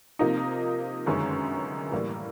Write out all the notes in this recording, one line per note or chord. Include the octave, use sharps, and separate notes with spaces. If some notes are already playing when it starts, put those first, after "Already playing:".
C3 F3 A#3 D#4
G1 F#2 D#3 G#3 C#4
A2 E3 G3 A#3